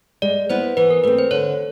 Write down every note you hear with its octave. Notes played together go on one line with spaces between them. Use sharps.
G#3 D5
B3 E4 C5
E3 B4
A#4
A3 C4 B4
C5
D3 C#5